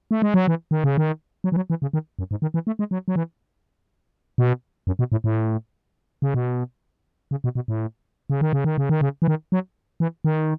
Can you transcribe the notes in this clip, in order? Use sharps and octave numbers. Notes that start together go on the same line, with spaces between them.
A3
G#3
F#3
E3
D#3
C#3
D#3
F#3
E3
F#3
E3
C#3
D#3
F#2
G#2
D#3
E3
A3
G#3
F#3
F#3
E3
B2
F#2
B2
A2
A2
C#3
B2
C#3
B2
B2
A2
C#3
D#3
C#3
D#3
C#3
D#3
C#3
E3
D#3
F#3
E3
D#3